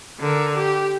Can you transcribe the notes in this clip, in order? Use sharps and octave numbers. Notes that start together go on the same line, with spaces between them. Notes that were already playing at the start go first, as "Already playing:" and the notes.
D3 A#4
G4